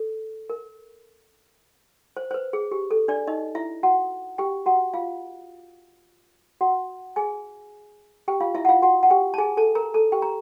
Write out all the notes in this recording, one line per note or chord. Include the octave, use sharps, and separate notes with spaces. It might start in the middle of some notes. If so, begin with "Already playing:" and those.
Already playing: A4
A#4
C5
C5
B4
G#4
G4
A4
D4 D5
D#4 D#5
E4 E5
F#4 F#5
G4 G5
F#4 F#5
F4 F5
F#4 F#5
G#4 G#5
G4 G5
F4 F5
E4 E5
F#5
F4 F5
F#4 F#5
F#5
G4 G5
A5
G#4 G#5
A4 A5
A#4 A#5
A4 A5
G4 G5
A#5